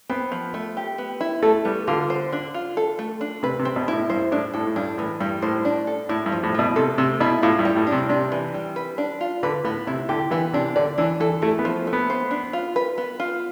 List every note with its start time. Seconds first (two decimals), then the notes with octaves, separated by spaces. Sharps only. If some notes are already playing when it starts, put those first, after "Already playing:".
0.10 B3 C4
0.32 F3
0.54 A3
0.77 G4
0.98 B3
1.21 E4
1.43 A3 A4
1.65 G3 B3
1.87 D3 F4
2.10 C5
2.33 D4
2.54 F4
2.77 A4
2.99 A3
3.21 D4
3.43 C3 B4
3.59 C3
3.65 C4
3.76 B2
3.88 A2 E4
4.10 G2 C5
4.32 A2 D4
4.54 A2 A4
4.67 A2
4.76 G2 D4
4.98 A2 E3
5.20 G2 G3
5.42 A2 C5
5.65 D4
5.87 A4
6.09 A2 E4
6.26 G2
6.32 F3
6.43 A2
6.55 B2 A3
6.76 C3 A4
6.98 C3 A3
7.21 B2 E4
7.43 A2 F4
7.59 G2
7.65 G3
7.76 A2
7.87 D4
7.92 C3
8.09 C3 D4
8.32 E3
8.54 G3
8.76 B4
8.98 D4
9.21 F4
9.43 D3 B4
9.64 A2 B3
9.87 C3 E4
10.09 D3 G4
10.31 E3 B3
10.53 C3 D4
10.76 D3 D5
10.98 E3 D4
11.20 E3 A4
11.42 A3 E4
11.59 B3
11.65 F3
11.87 A3
11.93 B3
12.10 C5
12.31 D4
12.53 F4
12.76 B4
12.98 B3
13.20 F4